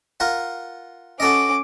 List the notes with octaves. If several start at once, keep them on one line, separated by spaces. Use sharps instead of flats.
F4 A#4 F#5
C#4 F#4 A4 D#5 D6